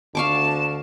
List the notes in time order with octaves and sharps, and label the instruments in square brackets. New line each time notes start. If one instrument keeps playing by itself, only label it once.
[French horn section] D2 D3 [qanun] F5 C#6 D6 [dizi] A5